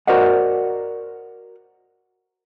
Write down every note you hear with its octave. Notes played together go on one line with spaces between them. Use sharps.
F#4 A#4 C5 D5 D#5 F#5